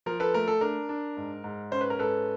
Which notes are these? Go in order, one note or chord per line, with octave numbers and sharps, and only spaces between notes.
F3 A#4
A4 B4
A3 A#4
A4
D4 A#4
D4
G#2
G#2
C#4 C5
B4
A#4
G#2 A4 B4